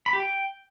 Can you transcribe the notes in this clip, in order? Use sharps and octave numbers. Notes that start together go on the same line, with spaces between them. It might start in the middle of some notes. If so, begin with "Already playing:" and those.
B5
G4
G5